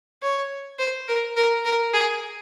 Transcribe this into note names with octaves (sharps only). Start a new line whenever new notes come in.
C#5
C5
A#4
A#4
A#4
G#4